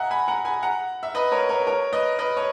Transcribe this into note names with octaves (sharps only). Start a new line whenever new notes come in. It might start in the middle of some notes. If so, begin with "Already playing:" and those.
Already playing: D#5 E5 F#5 G#5 A#5
G#5 B5
F#5 A#5
G#5 B5
F#5 A#5
E5
B4 D#5
A#4 C#5
A#4 C#5
A#4 C#5
B4 D#5
B4 D#5
C#5